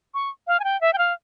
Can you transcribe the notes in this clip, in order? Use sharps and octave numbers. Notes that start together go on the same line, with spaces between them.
C#6
F5
G#5
G5
E5
G5
F5